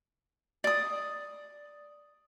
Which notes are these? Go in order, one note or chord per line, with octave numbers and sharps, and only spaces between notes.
D5 D#6